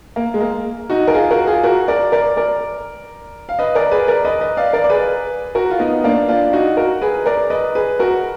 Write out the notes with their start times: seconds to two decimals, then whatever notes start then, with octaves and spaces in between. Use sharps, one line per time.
0.16 A#3
0.34 G#3
0.41 A#3
0.90 D#4 F#4
1.08 A#4
1.14 F4 G#4
1.31 F#4 A#4
1.47 F4 G#4
1.63 F#4 A#4
1.88 A#4 D5
2.12 A#4 D5
2.37 A#4 D5
3.49 F5
3.59 B4 D#5
3.75 A#4 D5
3.91 G#4 B4
4.08 A#4 D5
4.25 B4 D#5
4.41 B4 D#5
4.57 D5 F5
4.73 A#4 D5
4.84 D5
4.90 G#4 B4
5.55 F#4 A#4
5.70 F4
5.79 B3 D#4
6.04 A#3 D4
6.28 D4 F4
6.53 D#4 F#4
6.77 F#4 A#4
7.02 G#4 B4
7.26 A#4 D5
7.50 B4 D#5
7.75 G#4 B4
7.99 F#4 A#4